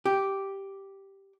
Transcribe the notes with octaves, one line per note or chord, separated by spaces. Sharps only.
G4